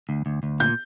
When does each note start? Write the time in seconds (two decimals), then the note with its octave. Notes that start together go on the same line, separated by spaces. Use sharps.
0.09 D2
0.26 D2
0.43 D2
0.60 A#2 G6